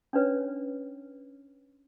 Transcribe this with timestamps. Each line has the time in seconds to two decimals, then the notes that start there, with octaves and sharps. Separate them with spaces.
0.13 C#4 D4 B4 C#5